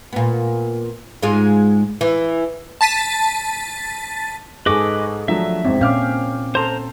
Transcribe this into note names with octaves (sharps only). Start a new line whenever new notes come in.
A#2 B3
G#2 G#3 F4
E3
A5 A6 B6 D#7
G#2 G#4 A4 B4 D#5 C#6 D6
F3 F#3 A3 D4 E5
G#1 E2 C4
A#2 C#4 F5 D6 F6 G6
A4 C5 A5 A#5 C6